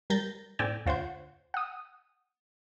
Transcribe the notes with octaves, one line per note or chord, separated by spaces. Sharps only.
G3 A#4 G6 A6 A#6
A2 C4 D5 G5 G#5 E6
D2 F4 C5 C#5 F#5 G6
F#5 D#6